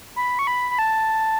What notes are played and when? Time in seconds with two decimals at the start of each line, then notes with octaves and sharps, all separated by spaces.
0.16 B5
0.39 C#6
0.47 B5
0.71 B5
0.79 A5